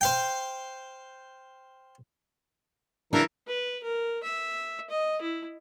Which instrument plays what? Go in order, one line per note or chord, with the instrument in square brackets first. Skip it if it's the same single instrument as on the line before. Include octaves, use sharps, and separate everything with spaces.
[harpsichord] C5 F5 G5
[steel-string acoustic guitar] C#3 D4 F#4 [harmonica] E3 A#4
[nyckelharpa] B4
A#4
E5
D#5
E4